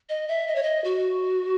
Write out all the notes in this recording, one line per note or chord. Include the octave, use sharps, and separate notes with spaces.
D#5
E5
D#5
C#5
D#5
F#4